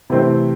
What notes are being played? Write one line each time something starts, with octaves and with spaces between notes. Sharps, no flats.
C3 E3 A3 C4